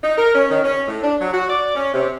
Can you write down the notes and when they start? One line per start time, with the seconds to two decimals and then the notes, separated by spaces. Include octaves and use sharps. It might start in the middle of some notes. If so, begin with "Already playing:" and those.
0.02 D#4
0.17 A#4
0.34 C#4
0.49 D#3
0.63 C#4
0.87 A2
1.03 D4
1.20 F#3
1.33 F#4
1.49 D5
1.76 C#4
1.93 C3